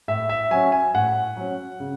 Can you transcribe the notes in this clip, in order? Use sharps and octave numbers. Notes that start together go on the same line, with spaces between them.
A2 E5
E5
F#3 C#4 G#5
G#5
A2 F#5
F#3 C#4
C#3